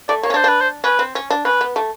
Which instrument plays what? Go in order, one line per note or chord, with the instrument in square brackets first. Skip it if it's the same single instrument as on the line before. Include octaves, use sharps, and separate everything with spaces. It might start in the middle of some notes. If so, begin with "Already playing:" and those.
[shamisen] A3 [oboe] D5
[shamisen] A#3 [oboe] C#5
[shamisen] C#4
[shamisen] D4 [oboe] C5
[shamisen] D4 [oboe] B4
[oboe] C5
[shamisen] C#4 [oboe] B4
[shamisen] C4
C#4
D4
[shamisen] C#4 [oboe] B4
[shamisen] B3
A3